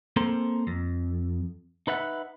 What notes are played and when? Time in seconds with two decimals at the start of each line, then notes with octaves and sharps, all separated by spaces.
0.16 A#3 C4 A4 A#4 C5
0.67 F2
1.87 D#4 B4 E5 F#5